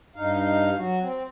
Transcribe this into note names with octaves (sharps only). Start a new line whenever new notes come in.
G2 D#4 F5
F#3 F#4
C4